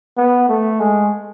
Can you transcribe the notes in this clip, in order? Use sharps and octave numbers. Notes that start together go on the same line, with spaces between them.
B3
A3
G#3